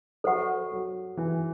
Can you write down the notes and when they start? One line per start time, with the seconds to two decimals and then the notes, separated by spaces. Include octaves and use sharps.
0.24 F#3 A4 C5 F#5 C#6
0.71 F#3
1.17 E3